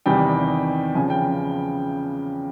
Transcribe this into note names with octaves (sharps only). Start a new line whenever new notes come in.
E2 C3 D#3 G3 G5
E2 C#3 F3 G#5
G5